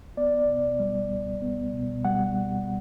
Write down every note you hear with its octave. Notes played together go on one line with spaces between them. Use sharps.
B3 D5
B2
G3
C#2
B3
B2
G3 F#5